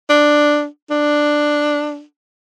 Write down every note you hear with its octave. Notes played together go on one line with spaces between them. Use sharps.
D4
D4